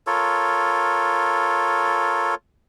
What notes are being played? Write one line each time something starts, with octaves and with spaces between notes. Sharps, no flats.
F4 A4 A#4 C#5